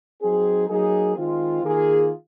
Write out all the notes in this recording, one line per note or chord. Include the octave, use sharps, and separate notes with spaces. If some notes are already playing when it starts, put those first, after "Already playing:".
F#3 C4 D#4 G#4
F#3 A#3 D#4 G#4
D#3 G#3 C4 F4
D#3 A#3 F4 G#4